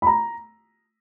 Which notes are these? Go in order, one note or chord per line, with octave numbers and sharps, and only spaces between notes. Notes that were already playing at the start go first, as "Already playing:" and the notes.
B5
A#5